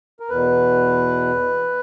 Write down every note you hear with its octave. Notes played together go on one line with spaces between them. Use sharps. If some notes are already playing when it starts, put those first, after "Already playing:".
A#4
E2 B2 B4